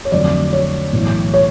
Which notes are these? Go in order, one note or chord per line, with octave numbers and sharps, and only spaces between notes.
C#5
F2 D3 F#3 A3 C4 D5
C#5
B1 A2 E3
C#5